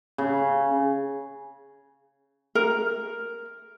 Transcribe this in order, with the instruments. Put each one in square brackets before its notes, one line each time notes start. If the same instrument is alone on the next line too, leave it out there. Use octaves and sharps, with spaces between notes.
[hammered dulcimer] C#3
[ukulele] A#4